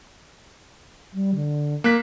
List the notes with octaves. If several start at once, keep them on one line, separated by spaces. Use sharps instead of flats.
G3
D3
A#3 F#6 B6